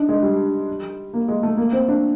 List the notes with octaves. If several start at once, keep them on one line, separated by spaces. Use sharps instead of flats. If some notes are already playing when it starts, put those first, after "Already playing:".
Already playing: D4 D#4
G#3
G3
A#3
G#3
A3
A#3
C4
D4